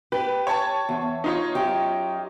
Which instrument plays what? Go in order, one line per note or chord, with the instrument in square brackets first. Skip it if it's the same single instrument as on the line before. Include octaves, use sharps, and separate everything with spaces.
[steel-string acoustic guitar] G4 [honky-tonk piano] B4
[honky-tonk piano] C#5 A5
[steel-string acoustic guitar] E2
[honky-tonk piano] D#4 F4 C#5
[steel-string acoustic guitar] F#2 G4